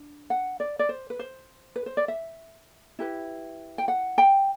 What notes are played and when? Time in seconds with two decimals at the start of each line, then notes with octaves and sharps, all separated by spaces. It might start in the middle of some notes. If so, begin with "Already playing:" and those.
Already playing: D4
0.30 F#5
0.60 D5
0.79 D5
0.89 C5
1.10 B4
1.19 C5
1.76 B4
1.86 C5
1.97 D5
2.08 E5
2.99 E4 G4 B4
3.78 G5
3.88 F#5
4.18 G5